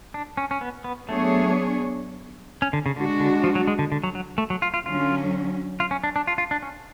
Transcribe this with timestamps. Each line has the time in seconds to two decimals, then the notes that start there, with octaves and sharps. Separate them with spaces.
0.14 D4
0.37 C#4
0.51 C#4
0.61 B3
0.84 B3
1.08 F#3 A3 B3 D4 G#4 C#5
2.62 C#4
2.73 D3
2.86 C#3
2.96 D3 G#3 D4 F#4
3.20 D3
3.44 F3
3.55 F#3
3.67 G#3
3.79 D3
3.92 D3
4.04 F#3
4.15 F#3
4.38 A3
4.50 F#3
4.62 F4
4.74 F4
4.86 D3 F#3 C#4 F4
5.80 F4
5.91 C#4
6.04 D4
6.16 D4
6.27 F4
6.38 F4
6.51 D4
6.63 C#4